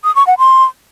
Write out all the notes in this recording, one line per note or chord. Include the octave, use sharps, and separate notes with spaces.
D#6
C#6
F#5
C6